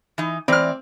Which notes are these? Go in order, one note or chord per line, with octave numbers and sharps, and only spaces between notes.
E3 D#4
E3 C4 D5 F6